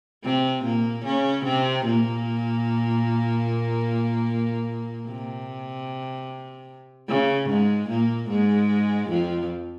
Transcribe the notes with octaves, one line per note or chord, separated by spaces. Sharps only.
C3 C4
A#2 A#3
C#3 C#4
C3 C4
A#2 A#3
C3
C#3
G#2 G#3
A#2 A#3
G#2 G#3
F2 F3